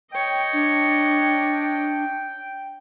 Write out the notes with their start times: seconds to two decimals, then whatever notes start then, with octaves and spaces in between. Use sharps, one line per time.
0.13 C#5 D#5 G5
0.53 D4